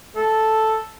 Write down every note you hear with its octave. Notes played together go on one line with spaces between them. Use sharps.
A4